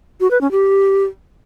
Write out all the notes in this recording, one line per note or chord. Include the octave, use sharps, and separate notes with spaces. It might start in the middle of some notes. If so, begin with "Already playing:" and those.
F#4
B4
C#4
G4